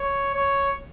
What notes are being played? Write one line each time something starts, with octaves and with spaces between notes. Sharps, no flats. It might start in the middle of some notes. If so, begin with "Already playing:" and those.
Already playing: C#5
C#5